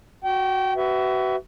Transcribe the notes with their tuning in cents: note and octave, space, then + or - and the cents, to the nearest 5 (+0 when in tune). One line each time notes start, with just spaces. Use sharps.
F#4 +0 G5 -25
F#4 +35 B4 +15 E5 +0